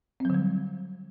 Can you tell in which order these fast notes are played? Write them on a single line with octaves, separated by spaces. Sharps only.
C4 F#3 D3 G3